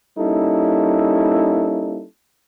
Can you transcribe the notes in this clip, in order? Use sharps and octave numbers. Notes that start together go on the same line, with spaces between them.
G3 A#3 C#4 D#4 E4 A4